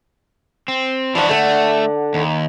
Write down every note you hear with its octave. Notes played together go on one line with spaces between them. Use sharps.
C4
E3 F3 D4 F#4
D3 A3 F#5
D#2